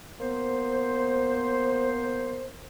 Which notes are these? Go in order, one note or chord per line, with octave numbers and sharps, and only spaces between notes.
A#3 B3 C5